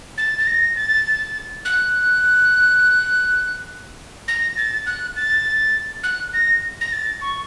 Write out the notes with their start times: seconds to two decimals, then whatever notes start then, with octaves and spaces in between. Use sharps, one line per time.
0.18 A6
0.38 A6
0.47 A#6
0.76 A6
1.65 F#6
4.28 A#6
4.57 A6
4.86 F#6
5.16 A6
6.04 F#6
6.34 A#6
6.81 A#6
6.93 A6
7.21 C#6